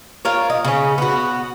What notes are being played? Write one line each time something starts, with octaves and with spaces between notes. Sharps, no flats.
F4 A#4 C#5
D#5
C#3 C#4
B3 F#4